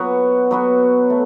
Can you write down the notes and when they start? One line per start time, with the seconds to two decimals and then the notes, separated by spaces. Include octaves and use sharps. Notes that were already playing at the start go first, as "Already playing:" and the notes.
Already playing: F#3 B3 F#4
0.51 F#3 B3 F#4
1.10 A3